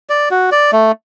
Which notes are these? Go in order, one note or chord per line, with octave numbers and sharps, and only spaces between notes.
D5
F#4
D5
A3